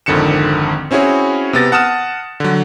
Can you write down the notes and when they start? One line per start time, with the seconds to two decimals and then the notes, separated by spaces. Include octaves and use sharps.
0.06 G#1 F2 D3 D#3 C#7 E7
0.91 C4 C#4 E4 F#4 G#4 C#5
1.53 C3 B3 A6 A#6
1.72 F#5 A5 D#6 F6 E7
2.40 D3 F#3